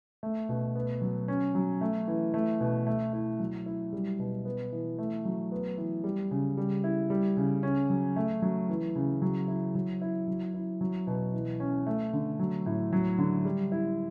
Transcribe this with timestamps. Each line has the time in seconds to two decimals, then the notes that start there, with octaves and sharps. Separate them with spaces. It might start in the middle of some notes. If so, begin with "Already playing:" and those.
0.23 A3
0.49 B2
0.75 B3
1.02 F#3
1.28 C#4
1.55 F#3
1.81 A3
2.08 E3
2.34 A3
2.60 B2
2.87 A3
3.13 E4
3.40 F#3
3.66 E4
3.93 G3
4.19 B2
4.45 B3
4.72 E3
4.98 A3
5.25 F#3
5.52 B3
5.78 E3
6.04 G3
6.31 C#3
6.57 G3
6.84 E4
7.10 G3
7.37 C#3
7.63 C#4
7.90 F#3
8.16 A3
8.42 F#3
8.69 E3
8.96 C#3
9.22 F#3
9.48 E4
9.75 F#3
10.02 E4
10.28 F#3
10.54 E4
10.81 F#3
11.07 B2
11.34 E3
11.60 C#4
11.87 A3
12.13 D3
12.39 F#3
12.66 A2
12.93 F#3
13.18 D3
13.45 G3
13.72 E4